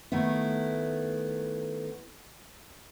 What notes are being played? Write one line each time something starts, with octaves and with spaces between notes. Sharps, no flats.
D#3 A3 B3 E4